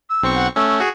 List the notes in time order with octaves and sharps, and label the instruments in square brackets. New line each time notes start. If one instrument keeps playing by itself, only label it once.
[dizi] E6
[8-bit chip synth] B1 C4 C#6
[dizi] F#5
[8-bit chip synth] A3 C#4 [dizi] E6
[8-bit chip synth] F#4 G#4